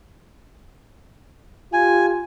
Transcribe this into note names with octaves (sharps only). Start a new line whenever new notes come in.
F4 G4 G#5